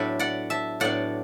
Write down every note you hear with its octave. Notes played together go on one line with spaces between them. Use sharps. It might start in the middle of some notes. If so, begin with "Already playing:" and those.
Already playing: A2 F#3 B3 D4 B4 E5
D5 F#5
E5 A5
A2 F#3 B3 D4 D5 F#5